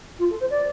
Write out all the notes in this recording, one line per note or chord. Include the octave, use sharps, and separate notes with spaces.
F4
A4
C5
D5